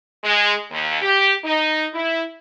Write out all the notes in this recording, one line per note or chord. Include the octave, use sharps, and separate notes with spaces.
G#3
D#2
G4
D#4
E4